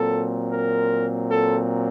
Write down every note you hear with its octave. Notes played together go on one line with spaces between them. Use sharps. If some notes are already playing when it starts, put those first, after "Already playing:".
Already playing: A#2 F#3 C4 A4
A#4
A4